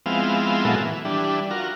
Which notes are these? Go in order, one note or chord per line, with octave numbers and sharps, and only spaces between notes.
F3 G#3 B3 C4 E4 F5
A#2 F#3 G#3 B3 E4 A4
E3
E3 G3 D4
F4 F#4 A#4